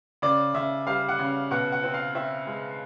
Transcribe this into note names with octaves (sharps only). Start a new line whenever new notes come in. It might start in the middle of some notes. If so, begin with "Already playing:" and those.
C#3 D5
C#3 E5
G3 F5
F#5
C#3
B2 F#5
F#5
C4
F5
C4 E5
G#3